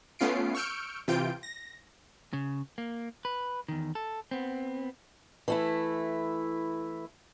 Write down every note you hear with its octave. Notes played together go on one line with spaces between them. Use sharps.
A3 B3 C#4 F4 C7 D7
C#6 E6 F6 G6 C#7 D7
C3 E3 F4 G5 G6 D7
A#6
C#3
A#3
B4
E2 D#3
A4
B3 C4
E3 A3 E4